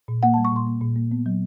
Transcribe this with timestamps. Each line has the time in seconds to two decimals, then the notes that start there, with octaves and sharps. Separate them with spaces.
0.08 A#2
0.23 A#3 F#5
0.34 A5
0.37 G3
0.45 C#6
0.52 A#2 C6
0.66 A#3
0.81 A#2
0.96 A#3
1.11 B3
1.26 F#3